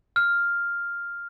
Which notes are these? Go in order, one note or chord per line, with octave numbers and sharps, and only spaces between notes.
F6